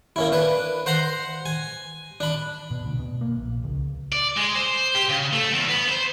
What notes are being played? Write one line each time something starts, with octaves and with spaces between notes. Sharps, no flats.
A#3 C#4 E4
D4 B4
C5 F#5 A#5 C6
G#5
D4 B5
B2
D2
B2
A#3
A#1
C#2
D5
G#3
C5
G4
C#3
A3
E2
B3
C5